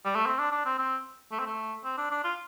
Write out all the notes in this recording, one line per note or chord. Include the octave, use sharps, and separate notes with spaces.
G3
A3
C4
D4
D4
C4
C4
A3
C4
A3
C4
D4
D4
F4